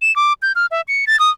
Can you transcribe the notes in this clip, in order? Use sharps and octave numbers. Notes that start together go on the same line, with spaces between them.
E7
D6
G6
F6
E5
C#7
A6
D#6